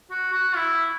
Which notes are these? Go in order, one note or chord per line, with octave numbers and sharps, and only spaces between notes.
F#4
F#4
E4